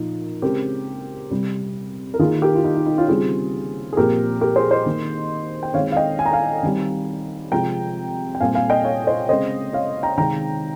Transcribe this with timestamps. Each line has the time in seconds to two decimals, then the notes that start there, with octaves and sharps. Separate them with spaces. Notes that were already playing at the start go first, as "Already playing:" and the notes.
Already playing: A#2 F3 A#3 D#4
0.42 C#3 G#3 C4 G4 A#4
1.31 C3 G3 C4
2.14 A#4
2.19 D#3 A#3 F4 G#4
2.42 G4 A#4
2.55 F4
2.64 D#4
2.75 D#4
2.86 D#4
2.97 C#4 F4
3.08 C#3 G3 C4 F4 G#4
3.93 G#4
3.97 A#2 F3 C4 G4 A#4
4.41 G4 A#4
4.56 G#4 C5
4.71 C5 D#5
4.85 D#3 A#3
5.63 G5
5.74 D#3 G#3 C4 C#5 F5
5.92 F5
5.97 D#5 G5
6.19 G#5
6.26 A#5
6.33 F5 G#5
6.63 D#3 G3 C4
7.52 C3 F3 G#3 C4 G5 A#5
8.35 G5
8.40 A#2 G3 C4 F5 G#5
8.55 F5 G#5
8.70 D#5 G5
8.85 C#5 F5
9.07 C5 D#5
9.29 C#3 G#3 C4 C5 D#5
9.73 C#5 F5
10.03 G5 A#5
10.18 C3 D#3 G#3 C4 G5 A#5